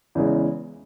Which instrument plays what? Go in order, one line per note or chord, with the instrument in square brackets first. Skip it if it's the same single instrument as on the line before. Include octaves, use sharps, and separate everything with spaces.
[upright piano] E2 C#3 E3 G#3